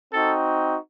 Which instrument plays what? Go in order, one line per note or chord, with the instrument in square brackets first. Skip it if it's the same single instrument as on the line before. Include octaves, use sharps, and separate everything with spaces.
[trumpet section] C4 D#4 F#4 A4